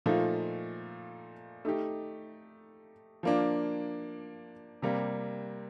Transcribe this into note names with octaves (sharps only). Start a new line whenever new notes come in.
A#2 F3 A3 D#4
A3 D#4 G4
F3 A#3 D4
C3 G3 A#3